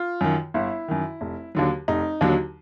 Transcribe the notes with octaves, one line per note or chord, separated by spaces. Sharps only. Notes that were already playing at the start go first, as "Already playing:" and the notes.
Already playing: F4
F#2 D#3
G1 E4
F#2 D#3
F1
D#2 D3 F#3
F1 D#4
D#2 D3 F#3